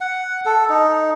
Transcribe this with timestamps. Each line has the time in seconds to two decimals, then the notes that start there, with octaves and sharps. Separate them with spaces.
0.01 F#5
0.46 A4
0.69 D#4